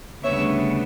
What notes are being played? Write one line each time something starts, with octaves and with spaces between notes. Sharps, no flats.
D2 C#3 G3 B3 D4 C#5 E5